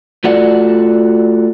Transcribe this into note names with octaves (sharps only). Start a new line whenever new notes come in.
A3 F4 F#4 D5 F#5